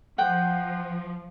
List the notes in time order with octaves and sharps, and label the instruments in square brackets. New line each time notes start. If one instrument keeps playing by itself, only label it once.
[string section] F3 [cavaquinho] F#5 G5